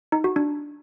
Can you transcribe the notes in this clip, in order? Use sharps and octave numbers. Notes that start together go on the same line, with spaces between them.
D#4
F#4
D4